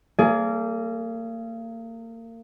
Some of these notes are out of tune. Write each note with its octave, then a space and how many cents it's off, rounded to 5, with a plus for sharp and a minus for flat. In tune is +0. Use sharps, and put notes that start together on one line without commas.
A#3 -35 G#4 +20 D5 -25